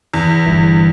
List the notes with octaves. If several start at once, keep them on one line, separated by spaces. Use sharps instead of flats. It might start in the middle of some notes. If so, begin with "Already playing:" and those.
E2
G1 G2 E3